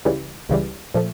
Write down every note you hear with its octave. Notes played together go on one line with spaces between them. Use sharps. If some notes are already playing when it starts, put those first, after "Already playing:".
C#2 C#3 E3 G3
C#2 C#3 E3 G3
A#2 F3 A3